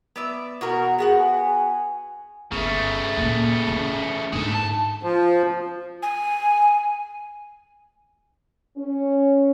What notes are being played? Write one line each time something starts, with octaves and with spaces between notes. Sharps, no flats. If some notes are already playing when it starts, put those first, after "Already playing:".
B3 D5 E5
B2 F#4 A#4
F#5
B3 F#4 G#4 F#5
G#5
G1 C#3 A3
A#2 A#3
E3 C#4
G#2 G#3 D4 A4
A5
F3
G#5
C#4